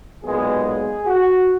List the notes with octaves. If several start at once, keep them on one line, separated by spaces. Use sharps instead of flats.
B1 A#2 G#3 B3 G#4
F#4